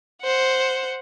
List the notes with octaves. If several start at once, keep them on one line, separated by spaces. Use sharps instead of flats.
C5 F#5